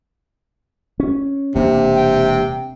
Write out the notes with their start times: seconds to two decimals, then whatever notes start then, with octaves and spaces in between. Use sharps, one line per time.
1.00 C#4
1.55 E1 C3 A#3 D4
1.96 G5